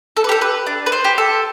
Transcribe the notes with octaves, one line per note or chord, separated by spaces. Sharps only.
A4
B4
G4 A4
B4
D4
B4
C5
G4
A4